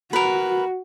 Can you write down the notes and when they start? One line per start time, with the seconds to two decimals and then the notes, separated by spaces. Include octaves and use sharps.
0.13 F#4 A#4 B4